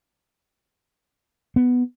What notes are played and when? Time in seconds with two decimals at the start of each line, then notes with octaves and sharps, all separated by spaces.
1.56 B3